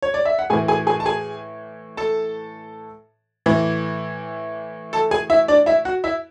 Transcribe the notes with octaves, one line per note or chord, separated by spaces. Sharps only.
C#5
D5
E5
F#5
A2 E3 G#4 G#5
G#4 G#5
G#4 G#5
A5
G#4 G#5
A4 A5
A2 E3
A4 A5
G#4 G#5
E4 E5
D4 D5
E4 E5
F#4 F#5
E4 E5